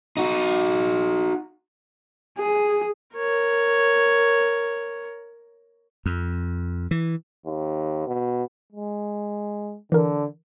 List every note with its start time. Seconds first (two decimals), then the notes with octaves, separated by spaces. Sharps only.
0.17 D#4 F#4
2.38 G#4
3.16 A#4 C#5
6.06 F2
6.91 E3
7.46 D#2
8.07 B2
8.73 G#3
9.92 D3 E3 A#4